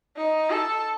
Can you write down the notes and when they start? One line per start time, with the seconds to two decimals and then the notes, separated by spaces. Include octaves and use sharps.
0.17 D#4
0.51 A4